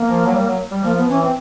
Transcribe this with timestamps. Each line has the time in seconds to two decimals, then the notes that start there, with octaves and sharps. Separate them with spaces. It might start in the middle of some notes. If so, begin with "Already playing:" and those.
Already playing: A#3
0.08 F3
0.26 F#3
0.33 G3
0.46 F#3
0.71 G3
0.83 F3 A#3
0.97 B3
1.09 E3 C#4
1.22 C4